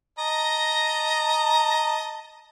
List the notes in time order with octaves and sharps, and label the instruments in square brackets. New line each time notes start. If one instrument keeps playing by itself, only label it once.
[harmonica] D#5 A5 A#5